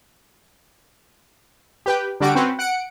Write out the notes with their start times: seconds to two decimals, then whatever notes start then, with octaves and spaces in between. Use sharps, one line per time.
1.86 G4 B4 G5
2.20 D3 G3 F#4 D7
2.35 C4 C#4 F#4 B4 C5
2.59 F#5 C#7 D7